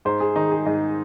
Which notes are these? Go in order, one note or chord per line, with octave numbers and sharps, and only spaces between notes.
G#2 C5
G#4
D#3 D#4
G#4
G#2 D#5